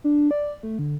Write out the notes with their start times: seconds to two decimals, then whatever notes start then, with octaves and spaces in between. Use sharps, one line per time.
0.04 D4
0.31 D5
0.63 A3
0.79 D3